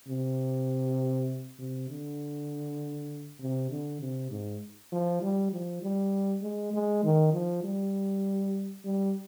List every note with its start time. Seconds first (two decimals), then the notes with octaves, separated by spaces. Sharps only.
0.08 C3
1.59 C3
1.89 D3
3.40 C3
3.70 D3
4.01 C3
4.31 G#2
4.92 F3
5.22 G3
5.52 F3
5.82 G3
6.42 G#3
6.73 G#3
7.04 D#3
7.33 F3
7.64 G3
8.85 G3